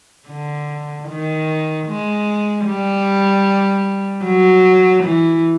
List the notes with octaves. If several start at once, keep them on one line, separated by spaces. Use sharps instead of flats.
D3
D#3
G#3
G3
F#3
E3